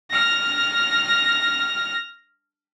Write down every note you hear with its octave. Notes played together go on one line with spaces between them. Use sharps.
F6 A#6